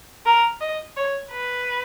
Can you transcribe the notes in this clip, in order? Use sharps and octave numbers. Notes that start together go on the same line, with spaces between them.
A#4
D#5
C#5
B4